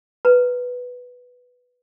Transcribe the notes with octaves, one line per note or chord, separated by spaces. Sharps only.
B4 A#5